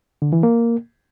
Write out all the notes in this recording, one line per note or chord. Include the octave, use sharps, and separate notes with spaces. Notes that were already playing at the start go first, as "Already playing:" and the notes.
D3
E3
A#3